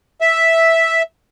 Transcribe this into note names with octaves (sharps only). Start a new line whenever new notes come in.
E5